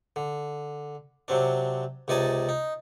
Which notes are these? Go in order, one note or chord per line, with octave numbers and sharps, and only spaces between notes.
D3
C3 F#3 C4 D4
C#2 C3 D#4 D5 G#5 A5
D#4